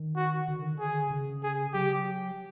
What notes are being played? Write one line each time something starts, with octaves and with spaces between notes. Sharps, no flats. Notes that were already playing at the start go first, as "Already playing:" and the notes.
Already playing: D#3
F#4
D3
D#3
D3
G#4
C#3
G#4
F#3 G4